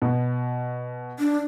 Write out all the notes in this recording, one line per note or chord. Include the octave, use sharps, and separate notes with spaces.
B2
D4